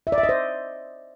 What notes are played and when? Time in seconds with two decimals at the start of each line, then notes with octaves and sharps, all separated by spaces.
0.07 E5
0.12 D5
0.18 E5
0.23 D#5
0.29 C5